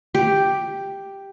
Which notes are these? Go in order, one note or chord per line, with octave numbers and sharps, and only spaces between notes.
G4